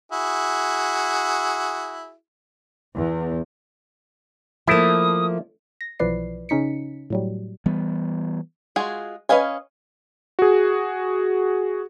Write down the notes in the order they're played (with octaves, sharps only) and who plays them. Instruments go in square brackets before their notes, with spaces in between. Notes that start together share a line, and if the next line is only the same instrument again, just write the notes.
[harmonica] E4 F#4 G#4
[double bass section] E2
[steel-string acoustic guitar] F3 A#3 [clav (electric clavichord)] A3 E4 [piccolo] D#6
[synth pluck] A#6
B1 E3 F3 B4 D5 C7
C#3 C#4 D#4 B6 C#7
A2 F#3 G3
[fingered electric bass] E3 G3 B3
[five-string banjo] G#3 F4 F#4 G#4
C#4 B4 D#5 F5 G#5
[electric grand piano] F#4 G#4